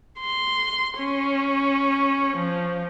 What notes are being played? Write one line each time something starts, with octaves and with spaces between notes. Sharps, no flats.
C6
C#4
F3